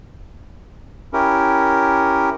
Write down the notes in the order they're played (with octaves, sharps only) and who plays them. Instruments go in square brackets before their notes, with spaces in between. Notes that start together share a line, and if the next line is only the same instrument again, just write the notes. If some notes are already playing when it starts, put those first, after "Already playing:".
[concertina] C#4 E4 G4 A#4